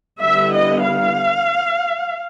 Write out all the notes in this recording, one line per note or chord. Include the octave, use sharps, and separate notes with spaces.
D3 G3 B3 E4 E5
D#5
F5